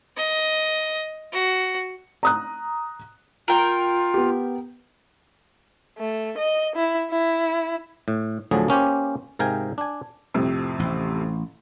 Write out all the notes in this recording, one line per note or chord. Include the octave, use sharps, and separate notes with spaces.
D#5
F#4
A#5 D#6 F#6
F4 A#4 G5
B3 G4
A3
D#5
E4
E4
A2
D2 A2 D3 F3 F#3 G#4
A#3 C#4 G4 C5
G#2 C3 A#4 F5 G5 G#5
D4 G#5
F2 A2 C3
A1